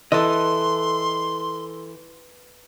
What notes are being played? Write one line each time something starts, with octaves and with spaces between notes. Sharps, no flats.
E3 A4 D#5 C6